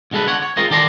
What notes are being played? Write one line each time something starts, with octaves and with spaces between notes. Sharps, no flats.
B1 D3 G#3 A4 B4
D3 C#5 F#5
C#5
G#3 C4 F4 A#4 C5 D#5
D#3 G4 A4 D5 A#5 C6